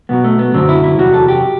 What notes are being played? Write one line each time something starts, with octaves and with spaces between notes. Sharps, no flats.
B1 B2 F#3 B3
A3
B3
F#2 D3 F#3 C4
E4
E4
E2 C3 F#3 F#4
A4
G4